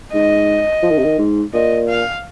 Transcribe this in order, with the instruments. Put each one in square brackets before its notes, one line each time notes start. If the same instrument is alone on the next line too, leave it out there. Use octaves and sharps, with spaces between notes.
[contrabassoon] G#2 [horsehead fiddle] D#5
[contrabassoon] F3
D#3
C3
D#3
G#2
[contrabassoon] A#2 [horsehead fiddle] D#5
[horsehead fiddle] F5